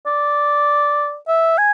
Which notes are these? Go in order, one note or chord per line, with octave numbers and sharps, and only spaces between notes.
D5
E5
G#5